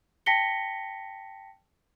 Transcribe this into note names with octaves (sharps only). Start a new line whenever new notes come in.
G5 A5 A#6 B6 C#7 G7